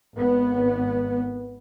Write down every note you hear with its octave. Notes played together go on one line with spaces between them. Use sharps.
G#1 B3